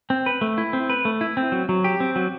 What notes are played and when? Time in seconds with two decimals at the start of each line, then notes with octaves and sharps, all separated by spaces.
0.10 C4
0.26 B4
0.41 A3
0.58 E4
0.73 C4
0.89 B4
1.05 A3
1.21 E4
1.37 C4
1.52 F#3
1.69 F#3
1.84 G4
2.00 C4
2.16 F#3